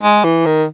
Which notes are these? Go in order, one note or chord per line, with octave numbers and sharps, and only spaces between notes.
G#3
E3
D#3